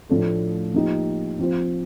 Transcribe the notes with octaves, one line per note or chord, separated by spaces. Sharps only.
A2 F3 A3 D4 A4
F3 A#3 D#4 G4
F3 C4 F4 C5